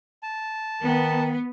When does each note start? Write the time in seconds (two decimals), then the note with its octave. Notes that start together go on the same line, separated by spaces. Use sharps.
0.23 A5
0.83 D#3 B3